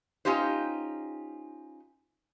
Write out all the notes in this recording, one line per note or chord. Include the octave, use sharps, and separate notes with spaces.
C#4 D#4 F4 G4 C5